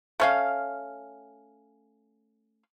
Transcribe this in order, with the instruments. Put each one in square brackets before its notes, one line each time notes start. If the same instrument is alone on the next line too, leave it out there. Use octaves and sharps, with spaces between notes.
[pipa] A3 C#4 F5